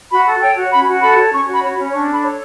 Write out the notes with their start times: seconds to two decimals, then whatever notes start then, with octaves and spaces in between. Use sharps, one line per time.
0.11 F#4 B5
0.27 A4
0.41 C#5 G5
0.57 F#4
0.72 C#4 B5
0.87 F#4
1.02 A4 B5
1.18 C#5
1.33 C#4 C#6
1.48 F#4
1.53 B5
1.63 C#5
1.72 B5
1.78 C#4
1.93 D4 C#6
2.09 A4 B5
2.23 C#5